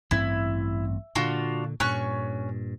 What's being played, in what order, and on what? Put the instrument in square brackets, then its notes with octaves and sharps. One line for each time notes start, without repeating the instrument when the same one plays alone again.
[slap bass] A1 G2 C4 [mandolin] E4
[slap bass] A#2 D3 [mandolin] D4 F4 F#4
[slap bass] G2 A#2 [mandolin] C#4 C#6 F#6